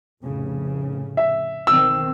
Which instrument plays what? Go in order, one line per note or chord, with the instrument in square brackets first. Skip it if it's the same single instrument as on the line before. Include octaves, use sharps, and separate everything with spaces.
[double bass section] F1 A2 C#3
[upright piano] E5
[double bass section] B1 D#3 C4 [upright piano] E6